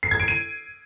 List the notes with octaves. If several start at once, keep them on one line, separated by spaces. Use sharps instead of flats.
C7
G#6
D7
D#7